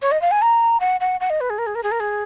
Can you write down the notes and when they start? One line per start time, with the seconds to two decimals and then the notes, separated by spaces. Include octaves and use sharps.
0.02 C#5
0.12 D#5
0.22 F5
0.31 G#5
0.42 A#5
0.80 F#5
1.01 F#5
1.20 F#5
1.30 D#5
1.41 B4
1.50 G#4
1.59 A#4
1.67 G#4
1.75 A#4
1.83 G#4
1.92 A#4
2.00 G#4